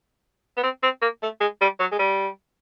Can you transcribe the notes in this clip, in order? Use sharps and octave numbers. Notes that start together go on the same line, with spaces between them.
B3
C4
C4
A#3
A3
G#3
G3
F#3
G#3
G3